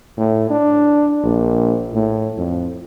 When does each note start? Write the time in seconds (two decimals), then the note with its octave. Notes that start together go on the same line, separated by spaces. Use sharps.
0.17 A2
0.50 D4
1.23 A#1
1.93 A2
2.37 F2